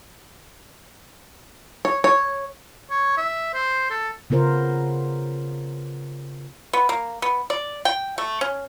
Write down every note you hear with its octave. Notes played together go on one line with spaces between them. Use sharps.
C#5
C#5
C#5
E5
C5
A4
C#3 B3 F4 A#4 C5
B3
A#3
B3
D5
G5
A3
C#4